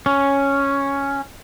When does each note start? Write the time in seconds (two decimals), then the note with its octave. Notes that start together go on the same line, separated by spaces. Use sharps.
0.06 C#4